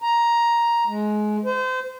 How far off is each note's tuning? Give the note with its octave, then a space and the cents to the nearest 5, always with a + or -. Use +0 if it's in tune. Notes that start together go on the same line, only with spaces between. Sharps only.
A#5 +10
G#3 +25
C5 -30